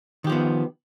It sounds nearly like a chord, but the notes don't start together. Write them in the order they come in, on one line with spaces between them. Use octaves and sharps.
D#3 G4 F3 B3